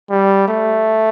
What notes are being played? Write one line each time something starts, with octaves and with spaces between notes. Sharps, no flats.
G3
A3